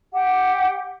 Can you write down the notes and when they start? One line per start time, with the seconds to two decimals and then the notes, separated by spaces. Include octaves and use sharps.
0.12 G4 F#5